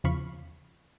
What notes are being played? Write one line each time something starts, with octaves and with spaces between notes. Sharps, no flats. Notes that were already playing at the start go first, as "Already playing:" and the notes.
E2 C#3 F3 F5 B5 C#6